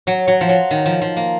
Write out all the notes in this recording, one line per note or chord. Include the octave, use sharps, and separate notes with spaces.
F#3
F#3
F3
F#3
D#3
F3
F3
A#3